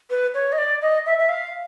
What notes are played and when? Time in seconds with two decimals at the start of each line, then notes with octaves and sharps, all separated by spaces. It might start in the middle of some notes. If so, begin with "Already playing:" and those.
0.10 B4
0.34 C#5
0.52 D#5
0.58 D5
0.82 D#5
1.06 E5
1.19 E5
1.29 F5